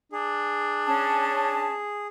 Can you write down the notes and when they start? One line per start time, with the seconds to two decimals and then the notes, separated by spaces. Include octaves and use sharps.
0.12 D4 G#4
0.87 C#4 A5